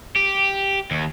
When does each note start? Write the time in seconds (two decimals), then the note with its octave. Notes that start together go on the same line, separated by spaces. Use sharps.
0.16 G4
0.91 D#2